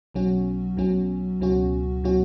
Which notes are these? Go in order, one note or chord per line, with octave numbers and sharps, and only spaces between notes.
B1 B2 F#3 C#4 F#4
B1 B2 F#3 C#4 F#4
C#2 B2 F#3 C#4 F#4
B2 F#3 C#4 F#4